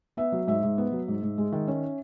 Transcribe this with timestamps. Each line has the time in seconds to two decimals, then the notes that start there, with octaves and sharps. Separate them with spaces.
0.17 B3 E5
0.32 F#3
0.47 G#2 E5
0.63 G#2
0.78 B3
0.92 F#3
1.08 G#2
1.23 G#2
1.38 G#3
1.52 D#3
1.68 C#4